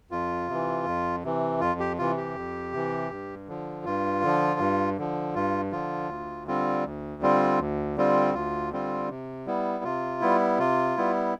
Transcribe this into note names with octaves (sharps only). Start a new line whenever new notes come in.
F2 F4
C3 E3
F2
C3 E3
F2 F4
G4
C3 E3 F4
G4
F2
C3 E3
G2
D3 F3
G2 F4
D3 F3
G2
D3 F3
G2 F4
D3 F3 F4
D2
D3 G3 C4 F4
D2
D3 G3 C4 F4
D2
D3 G3 C4 F4
D2 F4
D3 G3 C4 F4
C3
G3 B3 E4
C3 F4
G3 B3 E4
C3 F4
G3 B3 E4